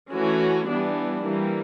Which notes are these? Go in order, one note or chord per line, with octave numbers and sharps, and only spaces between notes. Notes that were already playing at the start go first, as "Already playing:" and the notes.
E3 A3 C#4 F#4
E3 G3 B3 D4
E3 G3 A#3